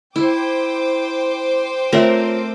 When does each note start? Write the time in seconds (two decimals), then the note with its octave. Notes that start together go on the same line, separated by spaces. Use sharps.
0.16 E4 C5 G5 D6
1.92 A3 C4 F4 A#4 C#5 E5